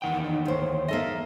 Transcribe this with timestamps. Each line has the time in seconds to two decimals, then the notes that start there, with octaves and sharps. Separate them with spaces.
0.02 E2 D#3 F#5 G5
0.22 D#4
0.46 D2 C5 C#5
0.88 A#3 A4 D#5 E5